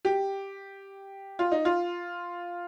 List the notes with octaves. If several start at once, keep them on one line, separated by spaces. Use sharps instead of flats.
G4
F4
D#4
F4